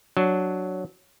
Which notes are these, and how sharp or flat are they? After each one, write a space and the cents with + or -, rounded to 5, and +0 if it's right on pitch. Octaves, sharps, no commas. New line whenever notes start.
F#3 +0 D4 +0